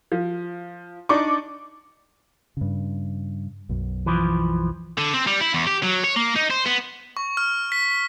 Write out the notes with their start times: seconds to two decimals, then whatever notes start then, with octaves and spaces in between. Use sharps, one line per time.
0.12 F3
1.09 D4 D#4 D5 C#6 D6
2.57 G2 C#3
3.69 B1 F#2
4.06 E3 F3
4.98 D3
5.14 C4
5.27 G3
5.41 E4
5.54 E2
5.67 G4
5.83 F#3
6.04 C#5
6.16 A#3
6.36 D#4
6.51 C5
6.66 B3
7.17 C#6
7.37 F6
7.72 B6